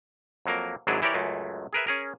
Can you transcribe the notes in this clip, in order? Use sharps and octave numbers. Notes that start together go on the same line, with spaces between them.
F2 F#3 A#3 A#4
G#1 G#2 F#3 D4 E4 G#4
E3 E4 G4 A#4 C#5 D5
C#2 F#2 G#3 A3
G#4 A#4 B4 E5
C#4 G#4 A#4